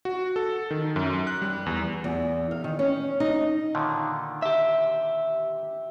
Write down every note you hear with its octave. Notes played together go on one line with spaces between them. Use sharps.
F#4
A4
D#3
F#2
F#6
G3
E2
E2
F5
D#3
C#4
D#4
A#2 D3 D#3
G4 E5